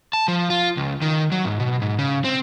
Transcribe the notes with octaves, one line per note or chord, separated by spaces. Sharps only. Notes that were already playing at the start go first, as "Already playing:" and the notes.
A5
F3
F4
C#2
D#3
F#3
G#2
B2
G#2
C#3
C4